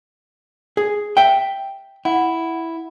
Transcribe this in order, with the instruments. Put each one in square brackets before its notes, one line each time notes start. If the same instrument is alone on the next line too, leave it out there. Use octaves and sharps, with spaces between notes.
[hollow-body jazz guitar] G#4
E5 G5
[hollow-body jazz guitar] E4 [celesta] F#5